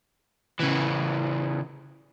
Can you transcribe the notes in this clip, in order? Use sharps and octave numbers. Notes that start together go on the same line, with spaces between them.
C#3 E3